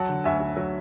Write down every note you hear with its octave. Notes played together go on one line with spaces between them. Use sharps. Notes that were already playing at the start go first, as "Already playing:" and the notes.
Already playing: F#3 F#5 A5
D3
D2 E5 G#5
D2
F#3